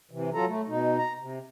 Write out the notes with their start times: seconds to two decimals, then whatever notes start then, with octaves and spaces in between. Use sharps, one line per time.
0.11 C3 E3
0.34 F#3 F4 A4 A#5
0.47 A3
0.67 B2 D#4
0.98 A#5
1.19 C3